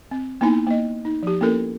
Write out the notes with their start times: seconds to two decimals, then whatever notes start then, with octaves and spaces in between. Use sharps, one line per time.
0.11 C4
0.41 A#3 B3 D#4 E4 G#5
0.67 A#3 D#5
1.05 D#4
1.23 F3 G4
1.41 A#3 B3 C#4 E4 A4 A#4